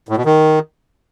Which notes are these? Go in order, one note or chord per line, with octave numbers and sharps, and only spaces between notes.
A2
B2
D#3